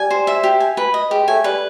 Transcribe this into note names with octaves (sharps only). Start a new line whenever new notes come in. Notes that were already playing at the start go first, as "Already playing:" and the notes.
Already playing: G3 G#5
C5
E5
G4
G#5
B4
D#5
G#3 G4
A3 G#5
G3 B4